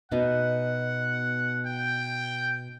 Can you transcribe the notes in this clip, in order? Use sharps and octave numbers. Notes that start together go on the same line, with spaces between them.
B2 B3 D#4 F#5
G5